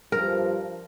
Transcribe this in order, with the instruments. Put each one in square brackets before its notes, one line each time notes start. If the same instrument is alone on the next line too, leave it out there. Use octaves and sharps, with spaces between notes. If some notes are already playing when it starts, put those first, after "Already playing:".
[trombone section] G2 F3 [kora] A#4